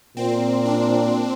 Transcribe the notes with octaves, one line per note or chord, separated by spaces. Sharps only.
A#2 C4
D4